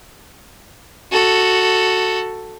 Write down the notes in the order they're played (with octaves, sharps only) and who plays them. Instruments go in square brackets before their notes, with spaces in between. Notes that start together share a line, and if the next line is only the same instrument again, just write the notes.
[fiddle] F#4 A4